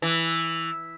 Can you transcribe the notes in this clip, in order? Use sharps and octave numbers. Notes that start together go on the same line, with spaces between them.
E3